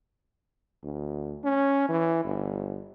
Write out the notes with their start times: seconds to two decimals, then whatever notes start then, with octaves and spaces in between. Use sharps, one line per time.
0.84 D2
1.44 C#4
1.89 E3
2.24 G1